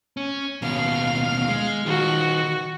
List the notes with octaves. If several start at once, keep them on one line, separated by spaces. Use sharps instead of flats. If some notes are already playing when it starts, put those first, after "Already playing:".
C#4
D#2 B2 F5
G#3
D#3 F4 F#4